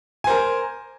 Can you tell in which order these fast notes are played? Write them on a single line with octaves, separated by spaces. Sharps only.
G#5 C5 A#4